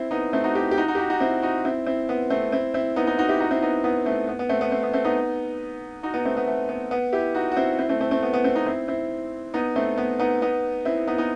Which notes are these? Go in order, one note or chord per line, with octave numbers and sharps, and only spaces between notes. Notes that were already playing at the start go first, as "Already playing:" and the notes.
Already playing: C4 E4
B3 D#4
A3 C4
D#4 F#4
E4 G4
G4
D#4 F#4
D#4 F#4
G4
D#4 F#4
D#4 F#4
C4 E4
D#4 F#4
C4 E4
C4 E4
B3
A3 C4
C4 E4
C4 E4
B3 D#4
B3 D#4
D#4 F#4
E4 G4
D#4 F#4
C4 E4
B3 D#4
B3 D#4
A3 C4
B3
B3
A3 C4
B3
A3 C4
B3
A3 C4
B3 D#4
D#4 F#4
B3 D#4
A3 C4
B3
A3
B3
B3
E4 G4
D#4 F#4
F#4
C4 E4
C4 E4
A3 C4
A3 C4
A3 C4
B3
B3
A3 C4
B3 D#4
C4 E4
C4 E4
B3 D#4
A3 C4
B3
B3 D#4
B3 D#4
C4 E4
B3 D#4
B3 D#4